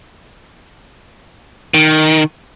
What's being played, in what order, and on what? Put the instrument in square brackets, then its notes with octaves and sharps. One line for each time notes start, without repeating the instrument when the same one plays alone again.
[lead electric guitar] D#3